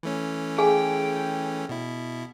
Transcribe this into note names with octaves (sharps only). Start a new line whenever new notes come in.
E3 A3 C#4
G#4 F5 G5 G#5
B2 E4